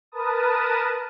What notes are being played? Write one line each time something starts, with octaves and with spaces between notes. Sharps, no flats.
A#4 B4 A5 D#6